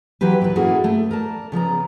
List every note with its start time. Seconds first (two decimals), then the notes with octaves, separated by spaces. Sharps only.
0.21 E3 F#3 C4 G4 B4
0.40 D#2 A#2 E4 B4
0.56 A#3 C#4 E4 F#4 G#4 A4
0.84 A3
1.11 A#4 D5 A5
1.52 C#3 F3 B3 A#5